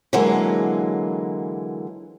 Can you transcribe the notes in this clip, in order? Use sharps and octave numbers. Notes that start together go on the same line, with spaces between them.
D3 E3 F#3 G#3 A#3